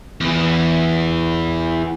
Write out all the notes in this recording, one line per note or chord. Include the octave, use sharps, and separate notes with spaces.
E2 E3